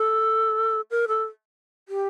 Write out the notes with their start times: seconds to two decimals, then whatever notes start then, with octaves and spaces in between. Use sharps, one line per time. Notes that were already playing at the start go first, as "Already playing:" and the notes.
Already playing: A4
0.91 A#4
1.08 A4
1.89 G4